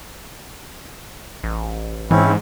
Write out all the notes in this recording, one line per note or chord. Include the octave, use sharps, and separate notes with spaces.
A1
G#2 E3 C4 C#4 E4